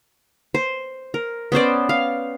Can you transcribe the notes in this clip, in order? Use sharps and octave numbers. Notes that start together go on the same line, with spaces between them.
C5
A#4
B3 C#4 C5 D5
F5